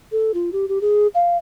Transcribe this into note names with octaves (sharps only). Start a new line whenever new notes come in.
A4
F4
G4
G4
G#4
F5